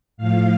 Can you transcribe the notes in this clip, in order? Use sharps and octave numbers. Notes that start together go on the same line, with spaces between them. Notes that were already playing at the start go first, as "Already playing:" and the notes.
A2 F3 F5